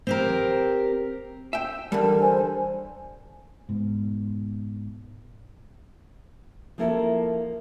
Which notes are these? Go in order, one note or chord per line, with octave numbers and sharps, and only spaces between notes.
C4 G4 A#4
E5 G5
D3 E3 G3 A#4 A5
C5 G#5
G#2 B2
F3 A#3 E4 A4 A#4